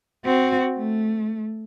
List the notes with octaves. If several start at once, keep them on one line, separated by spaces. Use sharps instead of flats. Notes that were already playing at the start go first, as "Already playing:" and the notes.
C4 F#4
A3